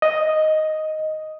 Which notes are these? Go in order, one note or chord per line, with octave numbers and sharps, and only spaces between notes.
D#5